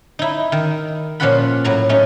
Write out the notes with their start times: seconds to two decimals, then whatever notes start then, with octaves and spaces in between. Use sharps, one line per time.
0.19 D#4 E4
0.52 D#3
1.20 A#2 F3 C#4 F4 F#5 B5
1.64 A2 F#3 A#5
1.89 A3 C#4 D#4